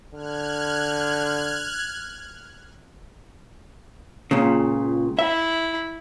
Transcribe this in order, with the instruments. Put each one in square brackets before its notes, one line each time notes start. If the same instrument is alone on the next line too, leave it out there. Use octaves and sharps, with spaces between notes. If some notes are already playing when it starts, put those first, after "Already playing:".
[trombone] D3 [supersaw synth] F6 F#6 G#6
[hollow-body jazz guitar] C#2 A#2 C#3
[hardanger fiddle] E4 [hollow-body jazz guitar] E5